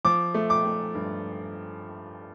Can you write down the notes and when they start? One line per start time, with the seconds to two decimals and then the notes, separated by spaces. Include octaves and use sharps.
0.05 F3 D6
0.34 A3
0.50 D6
0.65 A3
0.95 G2